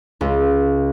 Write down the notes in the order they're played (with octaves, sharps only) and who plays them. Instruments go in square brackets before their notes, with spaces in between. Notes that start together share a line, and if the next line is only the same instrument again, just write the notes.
[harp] C#2